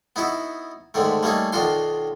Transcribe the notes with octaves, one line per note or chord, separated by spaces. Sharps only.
B3 D#4 E4 F#4
G#2 D3 D#3 A3
G3 A3 A#3 C#4 D#4
B1 D#3 D4 F4 F#4 C6